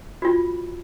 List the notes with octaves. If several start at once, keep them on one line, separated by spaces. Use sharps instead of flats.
F4 F#4